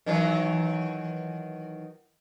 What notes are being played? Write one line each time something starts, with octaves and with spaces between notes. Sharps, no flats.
D#3 E3 F#3